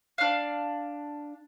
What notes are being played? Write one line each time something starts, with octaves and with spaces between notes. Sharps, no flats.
D4 F5